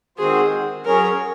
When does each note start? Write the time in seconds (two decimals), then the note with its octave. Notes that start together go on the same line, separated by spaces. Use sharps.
0.18 D#3 G#3 C4 F#4 G#4 C5
0.85 F#3 C#4 G#4 A#4 C#5